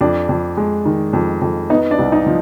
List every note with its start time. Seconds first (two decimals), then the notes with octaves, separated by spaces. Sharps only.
0.01 F2 D4 D5
0.29 F2
0.57 G#3
0.85 D#3
1.13 F2
1.41 F2
1.70 B3 D#4 D#5
1.91 D4 D5
1.99 C2
2.12 D#4 D#5
2.26 F3